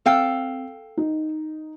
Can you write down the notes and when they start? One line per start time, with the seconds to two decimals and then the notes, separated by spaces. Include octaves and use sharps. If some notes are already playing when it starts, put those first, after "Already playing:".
0.06 C4 A4 F5 G5
0.97 D#4